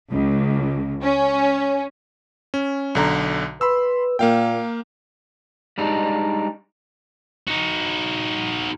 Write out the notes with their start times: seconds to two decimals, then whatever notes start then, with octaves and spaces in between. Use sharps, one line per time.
0.11 C#2
1.03 C#4
2.54 C#4
2.95 B1 D3 A#5
3.61 B4 B5 C6 E6
4.19 A#2 A#3 F5 G5
5.78 G3 G#3 D4 D#4
7.47 D#4 F#4